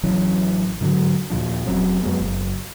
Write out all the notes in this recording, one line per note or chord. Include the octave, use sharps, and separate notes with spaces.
A1 E3 F#3 C#4
G#2 D3 F#3
D#2 A#2 F3 D4
F1 F#3 C4 C#4
F2 F#3 G#3 B3
F#1